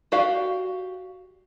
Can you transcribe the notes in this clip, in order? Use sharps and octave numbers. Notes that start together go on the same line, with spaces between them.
F#4 G4 D5 F5